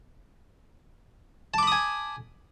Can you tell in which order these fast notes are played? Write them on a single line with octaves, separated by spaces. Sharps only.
A5 D6 B5 D#6 G#5